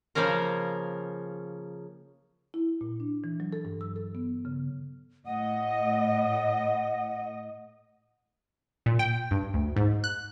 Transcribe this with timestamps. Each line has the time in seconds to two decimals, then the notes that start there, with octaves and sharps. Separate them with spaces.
0.15 C#3 F3 A#3 C#4 A#4
2.54 E4
2.81 A#2
3.00 D4
3.24 E3
3.40 F#3
3.53 A4
3.65 G2
3.81 E6
3.96 A4
4.15 B3
4.45 C#3
5.26 A2 D#5 F#5
8.86 A#2
8.99 G5
9.31 G2
9.54 D2
9.76 G#2
10.04 F#6